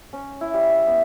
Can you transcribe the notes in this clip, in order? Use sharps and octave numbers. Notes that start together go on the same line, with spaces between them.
C#4
E4
G3
E5
B3